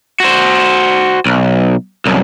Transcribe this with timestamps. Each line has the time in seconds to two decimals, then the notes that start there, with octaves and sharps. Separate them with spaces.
0.20 F#4 C5
1.26 B1
2.06 C2 F#2